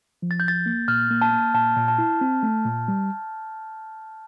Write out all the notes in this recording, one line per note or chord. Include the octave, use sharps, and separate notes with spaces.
F3
A6
G6
C2 A6
A#3
A#2 F6
A#3
A5
A#3
A#2 A5
A#2
A5
E4
C4
A3
A#2
G3